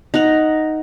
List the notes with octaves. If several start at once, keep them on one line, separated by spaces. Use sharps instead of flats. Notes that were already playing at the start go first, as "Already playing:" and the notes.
D#4 A#4 F#5 A#5